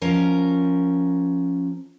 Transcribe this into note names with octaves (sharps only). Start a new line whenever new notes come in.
F3 C#4 A#4